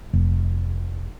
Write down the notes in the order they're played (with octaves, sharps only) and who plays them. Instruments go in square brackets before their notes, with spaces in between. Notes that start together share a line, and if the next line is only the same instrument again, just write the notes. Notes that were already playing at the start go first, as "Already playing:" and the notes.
[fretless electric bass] F1